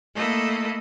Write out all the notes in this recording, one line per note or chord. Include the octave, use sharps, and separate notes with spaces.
A3 A#3 E4 A4 D#5